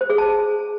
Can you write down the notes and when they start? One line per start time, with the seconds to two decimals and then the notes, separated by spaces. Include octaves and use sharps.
0.01 C5
0.10 G#4
0.18 A5